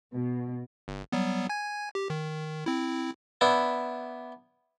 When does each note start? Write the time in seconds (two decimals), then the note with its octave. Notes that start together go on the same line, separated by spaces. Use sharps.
0.12 B2
0.88 G1
1.12 F#3 G3 B3
1.49 G#5 G#6
1.95 G4
2.10 D#3
2.66 C4 E4
3.41 B3 D4 E4